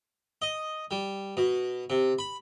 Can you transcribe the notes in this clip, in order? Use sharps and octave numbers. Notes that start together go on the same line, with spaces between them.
D#5
G3
B2
C3
B5